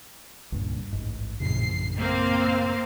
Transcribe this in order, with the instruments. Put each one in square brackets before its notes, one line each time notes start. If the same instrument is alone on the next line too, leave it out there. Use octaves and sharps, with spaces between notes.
[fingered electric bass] C#2 G2 A#2
A1 G#2
[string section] A#1 C7 [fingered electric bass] F#2 A2 C#3
[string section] A#3 C4 F5